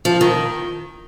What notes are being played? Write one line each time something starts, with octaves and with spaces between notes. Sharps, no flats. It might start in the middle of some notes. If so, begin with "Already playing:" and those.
F3
D#3